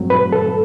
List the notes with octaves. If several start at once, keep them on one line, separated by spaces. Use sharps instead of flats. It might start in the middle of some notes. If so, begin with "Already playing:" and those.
Already playing: G2 F#3 A3 C4
B4
A4